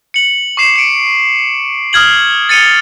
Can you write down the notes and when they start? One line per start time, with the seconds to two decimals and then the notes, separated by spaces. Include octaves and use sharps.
0.14 C#7 F#7
0.57 C#6 D6 C7 E7
0.76 C#7 D7
1.93 D#6 F6 G#6 F#7
2.49 A6 C#7 D#7 F7 G7